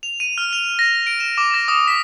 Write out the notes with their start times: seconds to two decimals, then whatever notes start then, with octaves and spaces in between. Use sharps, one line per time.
0.03 F7
0.20 D#7
0.38 F6
0.53 F7
0.79 A#6
1.07 D7
1.20 E7
1.38 D6
1.54 A#6
1.68 D#6
1.88 B6